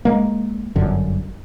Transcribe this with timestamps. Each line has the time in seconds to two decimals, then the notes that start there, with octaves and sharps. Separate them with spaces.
0.05 G#3 A#3
0.76 G1 F#2 D3